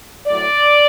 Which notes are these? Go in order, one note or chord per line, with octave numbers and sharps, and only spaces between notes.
A2 F#3 D5